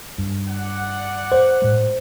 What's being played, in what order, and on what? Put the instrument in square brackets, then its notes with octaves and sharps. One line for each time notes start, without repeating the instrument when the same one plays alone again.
[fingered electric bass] G2
[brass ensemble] D5 F#5
[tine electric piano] C5
[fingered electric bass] A2 G#3